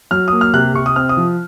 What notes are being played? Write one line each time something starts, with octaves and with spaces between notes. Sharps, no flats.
F#3 F6
A#3 D#6
F6
C3 F#6
C3 C#6
D#6
C4 F6
D#6
F3